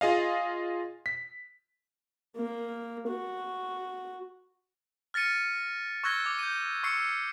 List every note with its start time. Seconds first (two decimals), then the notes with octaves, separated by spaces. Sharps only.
0.01 F4 G#4 D#5 F5
1.06 B6
2.36 A#3
3.09 F#4
5.14 F6 A6 A#6 C#7 D#7
6.04 C#6 E6 F#6 G#6 A#6 G7
6.26 D6
6.39 G6 D#7
6.83 C#6 E6 C7 C#7